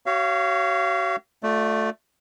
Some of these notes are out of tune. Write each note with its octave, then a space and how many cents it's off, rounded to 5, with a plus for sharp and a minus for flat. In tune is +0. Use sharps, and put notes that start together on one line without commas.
F#4 +40 C#5 +0 F5 -30
A3 +0 F4 +45 D5 +0